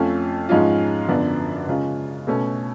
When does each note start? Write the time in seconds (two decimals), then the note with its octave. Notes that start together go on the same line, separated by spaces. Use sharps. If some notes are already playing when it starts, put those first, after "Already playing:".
Already playing: F2 F3 A3 C#4 F4
0.49 G#2 F3 G#3 C#4 F4
1.08 F#2 D3 F3 B3 D4
1.67 C#3 G#3 C#4 F4
2.27 B2 A3 C#4